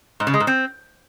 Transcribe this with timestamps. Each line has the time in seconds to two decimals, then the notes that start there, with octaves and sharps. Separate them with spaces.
0.20 G#2
0.27 C#3
0.34 G#3
0.40 G#2
0.47 C4